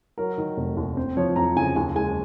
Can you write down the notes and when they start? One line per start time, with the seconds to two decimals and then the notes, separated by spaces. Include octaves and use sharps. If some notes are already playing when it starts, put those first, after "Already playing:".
0.18 F#3 A#4
0.38 D#3
0.57 F1
0.77 D#2
0.97 C4
1.17 F3 C#5
1.36 F2 A#5
1.56 C#3 G#5
1.76 D#2 G#5
1.95 G#3 G#5